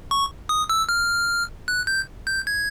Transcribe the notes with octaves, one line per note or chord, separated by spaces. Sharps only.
C#6
D#6
E6
F6
F#6
G6
G6
G#6